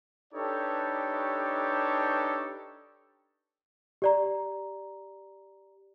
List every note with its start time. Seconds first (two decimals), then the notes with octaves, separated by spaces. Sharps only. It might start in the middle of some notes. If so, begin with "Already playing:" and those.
0.33 D4 D#4 G4 A4 B4 C#5
4.02 G4 D5 A#5